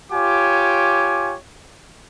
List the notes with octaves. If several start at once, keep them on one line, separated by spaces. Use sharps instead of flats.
F4 G4 C#5 G#5 D6